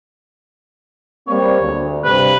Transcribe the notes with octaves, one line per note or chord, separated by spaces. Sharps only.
G3 A#3 C4 C#5
D2
G2 C3 B4